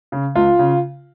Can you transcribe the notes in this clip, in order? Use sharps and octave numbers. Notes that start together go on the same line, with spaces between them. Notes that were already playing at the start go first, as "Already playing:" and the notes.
C#3
C#2 F4
C#3